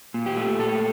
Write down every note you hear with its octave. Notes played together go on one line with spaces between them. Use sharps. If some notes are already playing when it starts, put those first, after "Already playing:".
A#2
G4
A3
A#2 A4